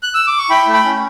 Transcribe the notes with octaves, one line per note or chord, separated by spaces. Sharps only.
F#6
E6
D6
C#6
E4 G5 B5
A3
G5 B5
C#4